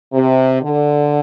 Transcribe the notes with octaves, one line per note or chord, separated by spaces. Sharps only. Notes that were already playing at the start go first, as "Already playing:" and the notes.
C3
D3